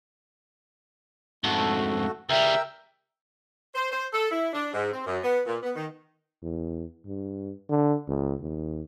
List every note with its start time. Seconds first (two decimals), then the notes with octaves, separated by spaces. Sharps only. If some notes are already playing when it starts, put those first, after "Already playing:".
1.44 F2 G#2 A3 F#4 A4
2.29 C#2 G3 A#4 E5 G5 E6
3.75 C5
3.92 C5
4.12 A4
4.31 E4
4.53 D4
4.73 G#2
4.92 C4
5.06 F#2
5.23 B3
5.45 A#2
5.63 B3
5.76 D#3
6.42 E2
7.05 G2
7.69 D3
8.08 C#2
8.41 D#2